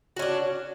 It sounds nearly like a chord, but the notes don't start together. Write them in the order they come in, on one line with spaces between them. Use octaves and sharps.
F#4 C#4 D4